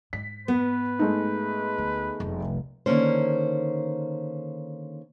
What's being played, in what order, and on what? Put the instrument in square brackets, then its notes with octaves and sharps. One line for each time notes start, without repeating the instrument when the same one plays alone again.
[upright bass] G#2 [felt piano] B6
[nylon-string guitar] B3 [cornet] B4
[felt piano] G#3 A3 D#4
[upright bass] D2
F1 C2
[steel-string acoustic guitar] D3 D#3 A#3 C#4 C5